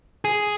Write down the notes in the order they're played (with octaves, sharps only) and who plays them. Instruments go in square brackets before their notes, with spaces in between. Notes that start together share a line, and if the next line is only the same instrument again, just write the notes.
[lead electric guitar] G#4